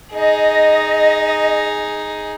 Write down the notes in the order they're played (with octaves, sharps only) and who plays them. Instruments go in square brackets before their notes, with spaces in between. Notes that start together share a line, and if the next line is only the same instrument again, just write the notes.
[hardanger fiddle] D#4 G#4 [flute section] D#5